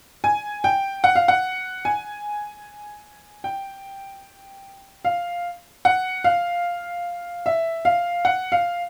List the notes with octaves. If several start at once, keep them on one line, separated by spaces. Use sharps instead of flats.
G#5
G5
F#5
F5
F#5
G#5
G5
F5
F#5
F5
E5
F5
F#5
F5